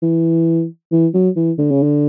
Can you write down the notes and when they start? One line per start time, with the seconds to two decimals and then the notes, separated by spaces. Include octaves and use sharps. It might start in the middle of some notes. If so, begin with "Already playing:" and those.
0.02 E3
0.92 E3
1.14 F#3
1.36 E3
1.58 D3
1.71 C#3
1.82 D3